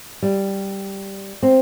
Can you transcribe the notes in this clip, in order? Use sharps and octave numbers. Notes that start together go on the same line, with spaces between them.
G3
C4